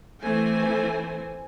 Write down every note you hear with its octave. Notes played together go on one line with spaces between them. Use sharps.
E3 A3 C4 G#5